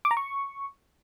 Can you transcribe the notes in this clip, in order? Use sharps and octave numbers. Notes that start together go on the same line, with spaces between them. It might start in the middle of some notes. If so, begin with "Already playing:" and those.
D6
A#5
C#6